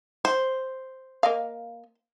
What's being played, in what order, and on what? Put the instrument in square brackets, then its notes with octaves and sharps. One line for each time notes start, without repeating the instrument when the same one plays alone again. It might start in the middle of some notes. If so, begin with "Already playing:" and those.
[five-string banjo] C5
[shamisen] A#3 D#5 F5